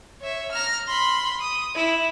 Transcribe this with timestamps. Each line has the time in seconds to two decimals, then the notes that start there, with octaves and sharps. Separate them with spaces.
0.21 C#5 E5
0.51 A#5 F6
0.87 B5 C6
1.40 D#6
1.74 E4